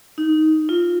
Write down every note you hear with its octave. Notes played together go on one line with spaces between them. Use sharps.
D#4
F4